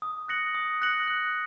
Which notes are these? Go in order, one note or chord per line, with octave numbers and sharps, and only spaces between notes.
D#6
F#6 A#6 C#7 F#7
D#6
F#6 A#6 C#7 F#7
F#6